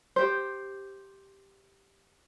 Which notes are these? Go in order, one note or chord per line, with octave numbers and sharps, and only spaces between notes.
G4 C5